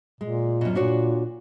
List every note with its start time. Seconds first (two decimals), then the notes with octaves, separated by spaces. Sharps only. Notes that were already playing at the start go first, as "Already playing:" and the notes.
0.21 A#2 G#3
0.61 F#2 B2
0.75 A#2 D4 F#4 C#5